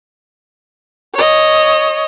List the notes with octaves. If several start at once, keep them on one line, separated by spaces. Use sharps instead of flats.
C#5 D#5